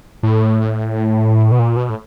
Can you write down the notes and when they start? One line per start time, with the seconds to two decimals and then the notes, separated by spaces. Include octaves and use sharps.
0.23 A2
1.52 B2
1.59 A#2
1.76 B2
1.89 A2